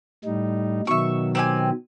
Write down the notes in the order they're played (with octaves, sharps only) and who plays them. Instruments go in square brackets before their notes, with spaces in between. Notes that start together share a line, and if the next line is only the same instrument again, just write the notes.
[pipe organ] A2 G3 D#4
[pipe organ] B2 D#3 F#3 [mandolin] E5 C#6
[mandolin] C4 G4 G#5